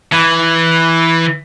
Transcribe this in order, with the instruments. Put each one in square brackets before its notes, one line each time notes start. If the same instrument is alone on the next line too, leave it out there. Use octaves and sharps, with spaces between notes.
[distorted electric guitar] E3